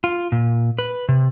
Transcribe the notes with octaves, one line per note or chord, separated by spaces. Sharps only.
F4
A#2
B4
C3